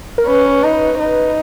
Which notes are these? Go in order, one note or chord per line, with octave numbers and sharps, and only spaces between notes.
A#4
C#4 B4
D#4
C5
D#4 B4